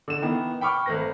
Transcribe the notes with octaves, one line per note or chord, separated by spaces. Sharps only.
D3 E7
D#3 E3 B3
G5 B5 C#6 D6 F6
G#1 A3 B4 A#6